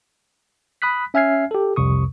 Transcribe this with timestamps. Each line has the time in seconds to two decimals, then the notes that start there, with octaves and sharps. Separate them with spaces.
0.82 B5 D#6 F#6 B6
1.14 C#4 E5 G#5 F6 G#6 C7
1.51 G4 A4
1.76 C2 F2 C3 C#6 D#6